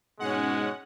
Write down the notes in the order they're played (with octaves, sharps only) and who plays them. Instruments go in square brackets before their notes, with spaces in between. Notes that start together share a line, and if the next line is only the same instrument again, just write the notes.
[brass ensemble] G#2 B2 [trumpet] G#3 [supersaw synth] C#4 F#5